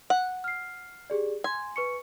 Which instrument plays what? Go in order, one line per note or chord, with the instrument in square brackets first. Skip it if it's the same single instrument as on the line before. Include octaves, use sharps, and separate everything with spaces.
[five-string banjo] F#5
[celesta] F6 C7
G4 G#4 D5
[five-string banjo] G#5 [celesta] C6
[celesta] B4 C#6 C#7